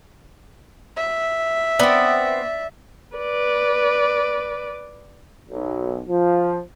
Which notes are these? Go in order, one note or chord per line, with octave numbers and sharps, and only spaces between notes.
E5
B3 C4 D5
B4 D5
B1
F3